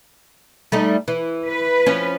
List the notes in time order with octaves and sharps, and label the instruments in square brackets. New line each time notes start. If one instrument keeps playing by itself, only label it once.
[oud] G3 A3 D#4
E3
[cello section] B4
[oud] F3 C#4